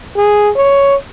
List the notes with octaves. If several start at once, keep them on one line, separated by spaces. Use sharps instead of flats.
G#4
C#5